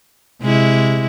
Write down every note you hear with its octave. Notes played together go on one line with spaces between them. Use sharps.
C3 G#3 E4